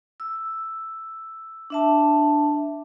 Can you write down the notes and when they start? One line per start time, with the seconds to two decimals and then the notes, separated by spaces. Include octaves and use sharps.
0.20 E6
1.70 D4 E5 A5